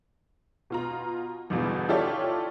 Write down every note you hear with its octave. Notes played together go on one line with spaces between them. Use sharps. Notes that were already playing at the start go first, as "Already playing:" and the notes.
B2 F4 A#5
G1 E2 B2 E3
E4 F4 G4 A4 C#5 D5